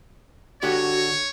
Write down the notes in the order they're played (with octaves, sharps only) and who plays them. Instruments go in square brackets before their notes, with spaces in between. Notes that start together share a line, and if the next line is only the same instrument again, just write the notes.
[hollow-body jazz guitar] D3 G4 F#5 [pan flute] F#4 [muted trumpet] C#5